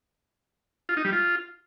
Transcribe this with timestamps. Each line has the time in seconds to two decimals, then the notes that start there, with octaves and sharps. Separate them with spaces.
0.89 F4
0.97 D#4
1.05 G3
1.13 F4